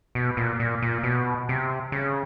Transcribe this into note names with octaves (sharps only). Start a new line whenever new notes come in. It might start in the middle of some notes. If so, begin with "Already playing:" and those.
B2
A#2
A#2
A#2
B2
C3
C#3